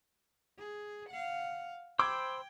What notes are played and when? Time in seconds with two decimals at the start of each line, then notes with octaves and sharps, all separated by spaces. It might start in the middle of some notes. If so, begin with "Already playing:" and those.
0.58 G#4
1.09 F5 F#5
1.99 C5 G5 B5 D6 E6 G#6